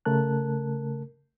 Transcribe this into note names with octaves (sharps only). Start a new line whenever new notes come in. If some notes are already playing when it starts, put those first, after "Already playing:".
C#3 A3 A#4 A5 F#6